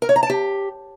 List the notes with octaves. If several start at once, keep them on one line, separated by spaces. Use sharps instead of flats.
A#4
C#5
A#5
A5
G4